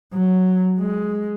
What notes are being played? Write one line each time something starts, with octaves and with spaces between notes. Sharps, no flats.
F#3
G#3